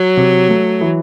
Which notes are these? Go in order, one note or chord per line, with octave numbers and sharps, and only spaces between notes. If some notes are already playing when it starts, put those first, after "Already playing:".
Already playing: F#3
C3
A3
E3